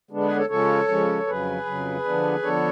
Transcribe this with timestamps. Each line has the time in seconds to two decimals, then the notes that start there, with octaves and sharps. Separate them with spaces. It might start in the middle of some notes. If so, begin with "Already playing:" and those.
0.11 D3 G#3 B3 D4
0.24 G#4 B4
0.36 A4 C#5
0.49 C#3 F3 G#3 C#4 A4 C#5
0.88 C#3 F3 G#3 C#4
1.27 F2 C#3 F#3 G#4 B4
1.65 F2 C#3 F#3
2.04 D3 F3 B3 D4
2.42 D3 F3 B3 D4 A4 C#5